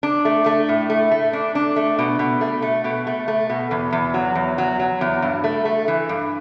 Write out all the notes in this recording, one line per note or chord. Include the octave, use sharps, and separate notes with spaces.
D4
A3
A3
A2
A3
A3
D4
D4
A3
B2
B2
A3
A3
B2
A3
A3
B2
E2
E2
F#3
E2
F#3
F#3
E2
G2
A3
A3
E3
G2